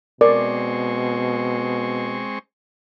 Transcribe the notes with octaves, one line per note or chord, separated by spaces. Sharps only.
B2 G#3 C4 A#4 D5 C#6